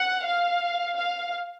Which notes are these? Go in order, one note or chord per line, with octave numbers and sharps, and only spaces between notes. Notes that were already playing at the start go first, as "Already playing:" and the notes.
Already playing: F#5
F5
F5